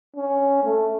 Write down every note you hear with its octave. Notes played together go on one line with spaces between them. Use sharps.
C#4
A3